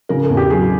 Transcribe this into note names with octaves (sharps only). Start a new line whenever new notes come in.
C#3 A#4
A4
E2
G4
F#3 G#4